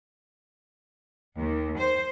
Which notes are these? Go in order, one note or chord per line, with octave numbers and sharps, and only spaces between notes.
D#2
C5